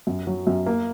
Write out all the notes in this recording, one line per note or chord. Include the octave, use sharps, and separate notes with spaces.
F#2
F#3
F#2
A#3